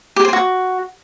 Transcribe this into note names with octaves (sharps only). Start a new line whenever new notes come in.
G4
C5
F#4